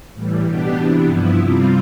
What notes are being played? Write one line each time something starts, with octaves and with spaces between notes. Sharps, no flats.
A2 E3 G3
B2 B3 D4 G4
C3 E3 B3 D4
G2 F3 B3 E4
C3 G3 C4 F4